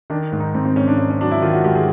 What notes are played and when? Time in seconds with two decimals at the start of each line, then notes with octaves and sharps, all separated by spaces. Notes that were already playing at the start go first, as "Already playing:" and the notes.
0.10 D#3 D4
0.32 G#2
0.40 D#4
0.55 G#2 C4
0.65 C4
0.76 G#2 C#4
0.88 D4
0.98 G#2 C#4
1.10 C#4
1.21 F#3 D4
1.31 E4
1.42 D#3 F4
1.53 F#4
1.65 G#2 G4
1.75 G#4